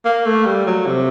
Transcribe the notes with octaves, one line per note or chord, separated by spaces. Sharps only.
A#3
A3
G3
F#3
C3